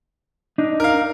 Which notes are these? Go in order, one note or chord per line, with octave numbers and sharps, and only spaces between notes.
D4 D#4
A#4 F5